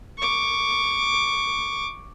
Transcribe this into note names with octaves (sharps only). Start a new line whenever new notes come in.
C#6 D6